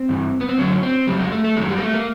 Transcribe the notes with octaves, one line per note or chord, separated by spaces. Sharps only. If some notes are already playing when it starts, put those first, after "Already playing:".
Already playing: C4
G2 E3
B3
C4
F#2 D3 F#3 C#4
C4
F2 C#3 F#3 G3
G#3
A3
A3
F#2 D#3 F#3 G#3
G3
A#3
A3
A#3